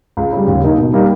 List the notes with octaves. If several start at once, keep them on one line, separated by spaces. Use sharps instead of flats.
C#2
C#3 G3
D#2
D#3 A#3 D#4
B2
G3 A#3 D#4